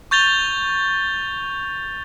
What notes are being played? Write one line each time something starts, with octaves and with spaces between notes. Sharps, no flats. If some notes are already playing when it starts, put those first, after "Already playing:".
C#6 G6 A6 F7 G7